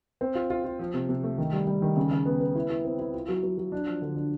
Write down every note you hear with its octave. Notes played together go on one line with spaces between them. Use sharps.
C4
F4
F4
F4
F3
C3
C3
A3
D#3
G3
G3
D#3
C#3
C#3
B3
B3
E4
E4
C4
E4
F4
F#3
F#3
F#3
D4
F3
D3
D4